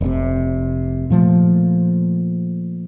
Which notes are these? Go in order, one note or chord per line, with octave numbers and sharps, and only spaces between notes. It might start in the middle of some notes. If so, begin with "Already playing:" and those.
F1 C3
A#2 F3 A3